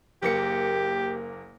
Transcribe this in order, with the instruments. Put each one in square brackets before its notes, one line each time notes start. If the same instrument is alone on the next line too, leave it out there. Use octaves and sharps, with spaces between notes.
[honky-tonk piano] F#1 A#3 C#7 [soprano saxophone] G4